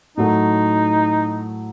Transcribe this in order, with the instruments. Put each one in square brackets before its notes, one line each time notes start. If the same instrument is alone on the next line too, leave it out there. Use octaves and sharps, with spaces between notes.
[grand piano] A2 F#3 A3 [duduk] D#4